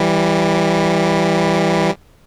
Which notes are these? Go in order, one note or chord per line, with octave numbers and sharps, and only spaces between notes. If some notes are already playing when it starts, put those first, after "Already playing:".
Already playing: E3 G3